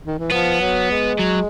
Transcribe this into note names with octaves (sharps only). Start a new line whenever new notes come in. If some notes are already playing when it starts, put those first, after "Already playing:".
D#3
E3
F3 B3
F#3
G#3
F#3